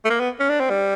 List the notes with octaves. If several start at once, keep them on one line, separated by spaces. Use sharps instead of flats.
A3
A#3
B3
C#4
D4
C4
G3